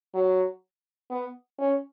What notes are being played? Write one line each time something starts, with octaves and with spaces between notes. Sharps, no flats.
F#3
B3
C#4